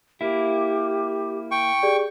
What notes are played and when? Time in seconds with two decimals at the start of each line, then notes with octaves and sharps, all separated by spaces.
0.21 A#3 E4 G4
1.51 G5 C#6
1.83 G4 G#4 D5